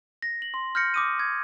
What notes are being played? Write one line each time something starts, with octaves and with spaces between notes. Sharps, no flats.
A#6
F#7
C6
F6 G6 A#6 C#7
D6 D#6 D#7
G#6